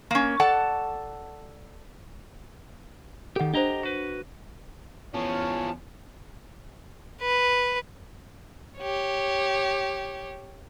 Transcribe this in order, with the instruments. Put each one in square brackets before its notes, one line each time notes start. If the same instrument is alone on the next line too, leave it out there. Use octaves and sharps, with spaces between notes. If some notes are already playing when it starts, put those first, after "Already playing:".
[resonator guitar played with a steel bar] A#3 C#4
A4 D5 F#5 A5
[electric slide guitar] D#3 G4 [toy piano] A4 F#5
[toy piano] D4 C5 [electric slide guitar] G4 D#5 A#5
[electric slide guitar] F#4 B4
[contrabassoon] E2 [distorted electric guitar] F3 C#4 [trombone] C#5 [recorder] A5
[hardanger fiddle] B4
[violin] G4 C#5